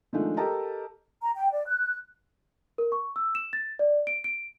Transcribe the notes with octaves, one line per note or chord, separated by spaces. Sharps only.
D#3 F3 G#3 A3 D4 F4
G4 A4 A#4 D#5 A5 A#5
A#5
G5
D5
F#6
A#4
C#6
E6
E7
A6
D5
D7
D7